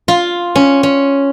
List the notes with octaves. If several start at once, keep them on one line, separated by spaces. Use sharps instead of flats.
F4
C#4
C#4